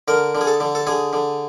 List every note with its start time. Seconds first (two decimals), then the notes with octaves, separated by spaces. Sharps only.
0.08 D3 A#4
0.35 D3
0.41 G#4
0.47 A4
0.60 D3
0.75 A4
0.87 D3 G#4
1.13 D3